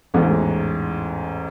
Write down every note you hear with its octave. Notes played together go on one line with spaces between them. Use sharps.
A1 E2 G#2